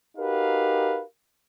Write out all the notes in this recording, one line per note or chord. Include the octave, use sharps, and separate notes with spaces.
D#4 F#4 G4 A#4 B4 F5